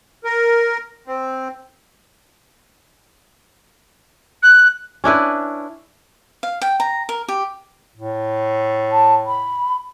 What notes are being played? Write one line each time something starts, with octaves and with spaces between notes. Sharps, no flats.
A#4
C4
F#6
C#4 D4 E4 B4
F5
G5
A#5
A#4
G4
A2
A5
B5